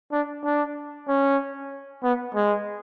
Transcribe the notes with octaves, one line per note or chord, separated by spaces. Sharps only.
D4
D4
C#4
B3
G#3